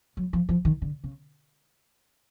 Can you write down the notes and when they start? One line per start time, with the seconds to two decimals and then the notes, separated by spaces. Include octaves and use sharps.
0.17 F#3
0.33 F3
0.49 F3
0.65 D#3
0.82 D3
1.04 C#3